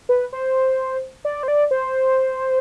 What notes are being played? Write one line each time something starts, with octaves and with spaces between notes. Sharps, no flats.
B4
C5
D5
C5
D5
C5